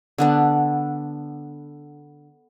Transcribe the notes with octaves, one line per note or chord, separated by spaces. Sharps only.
D3 B3 D4